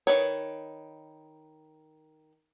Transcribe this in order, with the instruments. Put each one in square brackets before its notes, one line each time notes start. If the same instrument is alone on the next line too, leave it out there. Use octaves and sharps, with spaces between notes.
[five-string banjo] D#3 B4 C#5